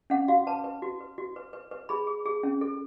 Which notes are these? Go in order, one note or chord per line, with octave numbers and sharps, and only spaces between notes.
C#4 F#5
F#4 F5
B4 A5
B4
F#4
B4
F#4
B4
B4
B4
G#4 B5
G#4
G#4
C#4
A4